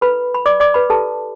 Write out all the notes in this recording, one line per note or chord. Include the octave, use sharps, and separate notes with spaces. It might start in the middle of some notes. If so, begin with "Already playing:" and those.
E4 A4 B4 B5
B5
D5 D6
D5 D6
B4 B5
E4 G4 A4 B4 A5